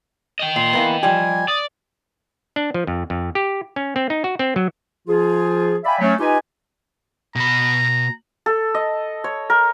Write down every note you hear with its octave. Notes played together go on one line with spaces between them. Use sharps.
D#5 G5
A#2 C6
E3 A#3 B3
F3 G3 G4 G#5
D5 D#6
D4
F3
F2
F2
G4
C#4
C4
D#4
F#4
C4
F#3
F3 F4 G#4
D5 E5 F5 G5 G#5 B5
F#3 A3 C#4
D#4 F4 G4 B4 D#5 G#5
B2 A#5 B5
A4
D#5
C#5
A#4